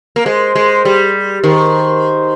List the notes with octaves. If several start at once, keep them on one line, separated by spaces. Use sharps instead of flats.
A#3
G#3 C5
G#3
G3
D#3 C5